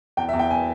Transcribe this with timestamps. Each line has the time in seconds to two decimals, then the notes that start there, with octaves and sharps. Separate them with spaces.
0.17 E2 G5
0.29 E5
0.33 E2
0.39 G5
0.51 G#5